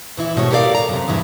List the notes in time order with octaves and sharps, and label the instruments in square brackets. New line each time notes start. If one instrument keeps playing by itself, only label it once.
[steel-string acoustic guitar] A#2 E3 E4
E2 G#2 B2 A3 C#5
G4 A4 A#4 C5 D5 F5
A#5
F#2 C3
E2 G2 E3 E4